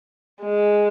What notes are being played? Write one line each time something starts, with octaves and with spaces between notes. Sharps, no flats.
G#3